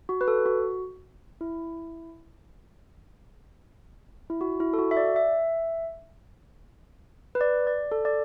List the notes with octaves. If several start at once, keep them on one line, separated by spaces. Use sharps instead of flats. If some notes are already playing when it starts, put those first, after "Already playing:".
F#4
B4
A4
F#4
E4
E4
F#4
E4
A4
F#4
E5
D5
E5
B4
D5
D5
A4
D5